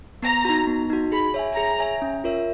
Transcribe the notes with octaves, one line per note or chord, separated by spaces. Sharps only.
B3 A#5
D#4 F#4
B3
D#4 F#4
G#4 B5
C#5 E5 G#5
G#4 A#5
C#5 E5 G#5
C#4
F4 A#4 C#5 E5